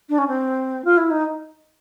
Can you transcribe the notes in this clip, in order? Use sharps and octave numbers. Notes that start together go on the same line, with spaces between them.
D4
C#4
C4
F4
E4
D#4